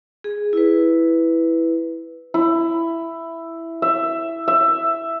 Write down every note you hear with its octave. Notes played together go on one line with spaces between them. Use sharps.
G#4
E4 B4
E4
E5
E5